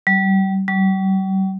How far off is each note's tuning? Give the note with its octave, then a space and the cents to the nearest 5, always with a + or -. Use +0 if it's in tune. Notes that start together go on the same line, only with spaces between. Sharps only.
G3 -30
G3 -40